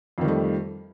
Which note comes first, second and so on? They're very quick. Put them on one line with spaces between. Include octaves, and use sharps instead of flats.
F2 D#3 G3 A3